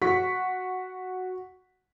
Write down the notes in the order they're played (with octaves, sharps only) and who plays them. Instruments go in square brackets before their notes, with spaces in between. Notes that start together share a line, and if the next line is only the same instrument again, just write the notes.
[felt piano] F#4 F#5 C#6 B6